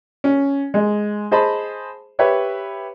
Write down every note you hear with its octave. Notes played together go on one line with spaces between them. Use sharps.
C#4
G#3
G#4 C5 D#5 A5 B5
G4 B4 C#5 E5